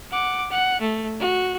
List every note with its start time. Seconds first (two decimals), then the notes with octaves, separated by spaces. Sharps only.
0.11 F#5 D6
0.51 F#5
0.81 A3
1.21 F#4